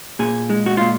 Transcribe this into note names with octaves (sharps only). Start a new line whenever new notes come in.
A#2 G#4
G#3
F#4
A#2 F4